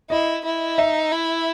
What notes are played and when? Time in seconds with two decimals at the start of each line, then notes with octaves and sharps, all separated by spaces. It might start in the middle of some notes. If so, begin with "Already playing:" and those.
0.10 E4 D#5
0.45 E4
0.78 D#4 E5
1.12 E4